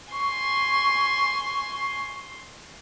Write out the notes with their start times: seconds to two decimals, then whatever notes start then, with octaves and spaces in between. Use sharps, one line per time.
0.13 G#5 C6 C#6